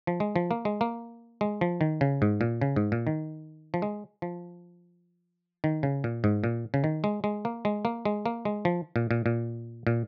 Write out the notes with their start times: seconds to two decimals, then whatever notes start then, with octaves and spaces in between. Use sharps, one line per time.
0.07 F3
0.20 G#3
0.36 F3
0.51 A#3
0.65 G#3
0.81 A#3
1.41 G#3
1.61 F3
1.81 D#3
2.01 C#3
2.22 G#2
2.41 A#2
2.61 C#3
2.76 G#2
2.92 A#2
3.07 D#3
3.74 F3
3.82 G#3
4.22 F3
5.64 D#3
5.83 C#3
6.04 A#2
6.24 G#2
6.44 A#2
6.74 C#3
6.84 D#3
7.04 G#3
7.24 G#3
7.45 A#3
7.65 G#3
7.85 A#3
8.05 G#3
8.26 A#3
8.45 G#3
8.65 F3
8.96 A#2
9.11 A#2
9.26 A#2
9.87 A#2